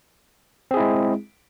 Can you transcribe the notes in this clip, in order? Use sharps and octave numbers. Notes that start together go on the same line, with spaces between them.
G#3 C4 E4 G#4